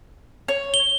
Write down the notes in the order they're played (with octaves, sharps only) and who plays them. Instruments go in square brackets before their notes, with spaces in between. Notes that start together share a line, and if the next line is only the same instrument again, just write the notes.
[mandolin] C#5
[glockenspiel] G7